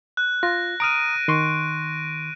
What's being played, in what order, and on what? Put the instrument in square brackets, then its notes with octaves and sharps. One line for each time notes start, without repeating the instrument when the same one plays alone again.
[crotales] F#6
[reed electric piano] F4 [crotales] A#6
[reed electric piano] A#5 D#6 F6 [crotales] D7 D#7
[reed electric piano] D#3 C6 C#6